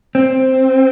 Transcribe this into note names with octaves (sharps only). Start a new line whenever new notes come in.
C4